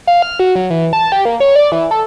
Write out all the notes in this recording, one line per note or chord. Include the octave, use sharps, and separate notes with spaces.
F5
F6
F#4
F#3
E3
A5
G4
A#3
C#5
D5
E3
A4